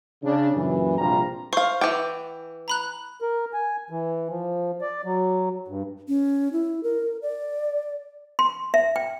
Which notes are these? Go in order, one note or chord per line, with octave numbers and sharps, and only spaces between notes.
C#3 D4
F#2 A#2 C#3 E3
A#1 C3 G3 D4 F4 A#5
C5 F5 C#6
E3 F#5 G5 D6
A#5 B5 F#6
A#4
G#5
E3
F3
D5
F#3
G2
C#4
E4
A#4
D5
C6
E5
G5